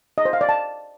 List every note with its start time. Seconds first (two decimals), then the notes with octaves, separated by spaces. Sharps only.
0.18 D#5
0.25 C5
0.33 F5
0.41 D5
0.49 A5